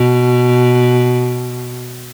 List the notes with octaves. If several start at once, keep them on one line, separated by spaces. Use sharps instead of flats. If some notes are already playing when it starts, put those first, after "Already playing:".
Already playing: B2